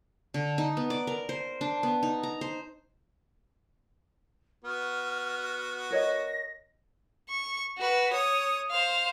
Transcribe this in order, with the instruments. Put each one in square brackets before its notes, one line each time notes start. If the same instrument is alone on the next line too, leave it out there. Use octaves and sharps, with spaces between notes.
[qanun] D3
D#4
B3
D5
A#4
C5
D4
B3
D#4
A#5
C5
[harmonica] B3 F#4 [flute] F6
[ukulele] A#4 C#5 D#5 [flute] A#6
[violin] C#6
F#4 B4
C#5 D#6
C5 F5